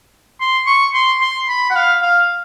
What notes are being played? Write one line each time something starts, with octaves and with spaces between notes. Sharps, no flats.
C6
C#6
C6
C6
B5
F#5
F5
F5